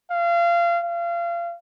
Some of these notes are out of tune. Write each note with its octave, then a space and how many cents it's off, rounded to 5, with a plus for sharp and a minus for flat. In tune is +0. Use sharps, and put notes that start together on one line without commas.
F5 -30
F5 -30